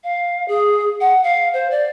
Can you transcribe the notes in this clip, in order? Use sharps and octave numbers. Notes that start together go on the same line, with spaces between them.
F5
G#4
F#5
F5
C5
D5